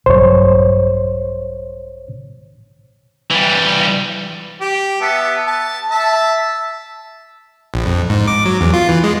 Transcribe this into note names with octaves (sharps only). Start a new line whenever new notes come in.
A#1 G2 F#3 C5 C#5
E3 G3
G4
B3 E5 A5
A5
E5 A5
A#1
F2
G#2
D6
F#3
E2
F4
E3
G#3